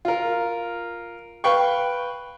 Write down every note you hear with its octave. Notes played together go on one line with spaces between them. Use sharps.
F4 A#4
B4 F5 G5 C#6